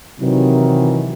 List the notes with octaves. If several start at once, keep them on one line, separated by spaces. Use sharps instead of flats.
C3 D#3 E3 F#3